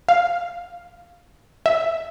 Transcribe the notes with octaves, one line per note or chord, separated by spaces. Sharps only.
F5
E5